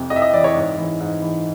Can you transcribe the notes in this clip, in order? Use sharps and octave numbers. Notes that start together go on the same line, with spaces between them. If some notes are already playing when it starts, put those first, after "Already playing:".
Already playing: F2 C3
F2 D#5
E5
D#5
E3 D5
C#5
G#2
E3
G#2
E3